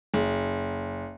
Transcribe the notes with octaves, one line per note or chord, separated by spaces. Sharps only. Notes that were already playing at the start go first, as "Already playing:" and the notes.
F#1